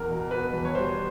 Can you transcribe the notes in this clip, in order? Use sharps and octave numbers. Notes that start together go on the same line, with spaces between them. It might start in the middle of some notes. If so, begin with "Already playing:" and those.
Already playing: E2 A#4
B2
B2 B4
E2
C#5
G3 C5